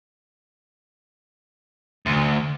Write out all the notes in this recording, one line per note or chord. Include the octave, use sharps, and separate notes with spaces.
D2